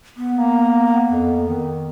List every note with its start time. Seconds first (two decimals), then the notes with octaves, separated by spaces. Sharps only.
0.17 B3
0.36 A#3
1.12 F2
1.49 D#3